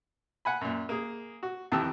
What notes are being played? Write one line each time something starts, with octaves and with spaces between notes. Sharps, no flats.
F#5 G#5 B5
F#2 A#2
A#3 G#4
F#4
F2 D#3 E3 G4 A5 E6